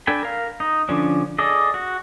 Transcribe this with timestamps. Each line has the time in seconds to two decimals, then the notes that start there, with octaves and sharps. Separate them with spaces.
0.07 D4 A4 G5 G#5 B5
0.23 A#4 F5
0.60 D#4
0.89 D3 F3 C#4 D4
1.38 G#4 A4 D5 D#5
1.74 F#4